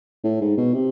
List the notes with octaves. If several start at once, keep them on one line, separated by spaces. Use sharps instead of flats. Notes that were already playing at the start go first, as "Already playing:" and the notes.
A2
G#2
B2
C3